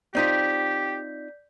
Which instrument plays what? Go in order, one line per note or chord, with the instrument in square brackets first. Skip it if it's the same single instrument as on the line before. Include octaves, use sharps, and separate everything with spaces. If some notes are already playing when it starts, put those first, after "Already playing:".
[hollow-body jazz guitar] C4 D#4 F4 [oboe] G4 [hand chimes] D5 G6 B6